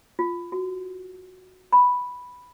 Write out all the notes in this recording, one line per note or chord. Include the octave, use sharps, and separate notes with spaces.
F4
F#4
B5